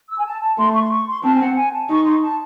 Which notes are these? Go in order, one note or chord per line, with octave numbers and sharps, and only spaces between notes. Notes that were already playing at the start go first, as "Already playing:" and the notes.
E6
G#5
A5
A5
A3 C6
C#6
C6
C#6
C6
C4 A5
G#5
F#5
G#5
A5
D#4 C#6
C6
A5